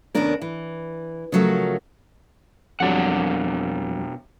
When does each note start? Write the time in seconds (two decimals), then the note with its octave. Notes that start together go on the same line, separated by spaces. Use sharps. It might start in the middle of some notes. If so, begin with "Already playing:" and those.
0.15 D#2 C3 B3 C#4 D4 A#4
0.42 E3
1.32 C#3 F3 F#3 A3 A#4
2.80 F2 B2 F#3 G3 D4 F#5